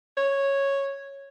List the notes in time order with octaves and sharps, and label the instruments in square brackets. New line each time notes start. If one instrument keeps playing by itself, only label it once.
[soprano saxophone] C#5